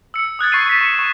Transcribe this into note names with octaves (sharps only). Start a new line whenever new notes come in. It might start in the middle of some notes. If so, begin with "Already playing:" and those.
E6 C#7
D#6 F#6 G#6 A6
C#6 C7 D#7
A6 B6 E7
C#6 C#7 E7
C#6